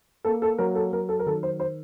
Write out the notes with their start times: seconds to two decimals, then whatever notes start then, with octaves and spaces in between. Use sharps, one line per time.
0.24 A#3 A4
0.42 A4
0.58 F#3 A#4
0.75 A4
0.93 F#3 A#4
1.09 A4
1.19 A#4
1.26 D#3 A4
1.43 C5
1.60 C5